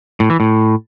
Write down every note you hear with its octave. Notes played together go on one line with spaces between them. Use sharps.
A2
E3
A2